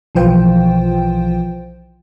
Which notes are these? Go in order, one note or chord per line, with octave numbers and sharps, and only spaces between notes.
B1 E3 F3 F4 C5 G5